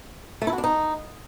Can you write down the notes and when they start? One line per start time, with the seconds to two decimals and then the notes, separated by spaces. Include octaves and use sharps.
0.42 A3
0.47 E4
0.53 F#4
0.58 D4
0.64 D#4